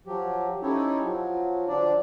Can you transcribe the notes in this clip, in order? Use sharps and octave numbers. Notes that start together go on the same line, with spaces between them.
F3 F#3 G4
C#4 D#4 E4 G4 A4 C#5
F3 F#3
D3 F3 D4 D5